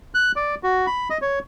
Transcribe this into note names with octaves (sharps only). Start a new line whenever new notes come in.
F#6
D5
F#4
B5
D#5
C#5